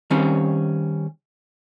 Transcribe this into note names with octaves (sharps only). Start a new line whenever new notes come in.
D#3 G3 C4 C#4